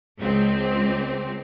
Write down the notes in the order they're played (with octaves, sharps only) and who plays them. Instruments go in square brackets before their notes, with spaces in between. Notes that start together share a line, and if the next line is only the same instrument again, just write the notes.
[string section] C#2 C4